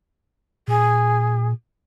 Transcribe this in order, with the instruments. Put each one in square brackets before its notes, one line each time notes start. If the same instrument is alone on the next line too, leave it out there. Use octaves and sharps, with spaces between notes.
[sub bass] A#2 [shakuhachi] G#4